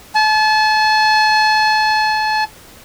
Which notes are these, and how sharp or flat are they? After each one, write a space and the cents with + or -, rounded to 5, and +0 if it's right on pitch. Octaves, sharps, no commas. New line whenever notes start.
A5 -35